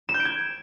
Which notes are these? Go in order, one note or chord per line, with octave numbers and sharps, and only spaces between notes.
E7
G6
D7
G#6